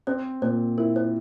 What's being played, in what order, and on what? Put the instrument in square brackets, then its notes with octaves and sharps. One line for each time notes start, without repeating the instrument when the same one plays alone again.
[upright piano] C4 [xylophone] C5
[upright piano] A#2 [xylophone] C5
[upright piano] E4 [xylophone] A#4
[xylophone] C5